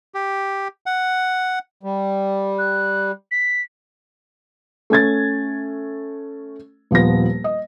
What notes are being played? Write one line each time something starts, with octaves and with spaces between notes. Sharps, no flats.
G4
F#5
G3
F#6
B6
A3 C#4 G#6 A6
D#1 F3 B3 A#6
D#5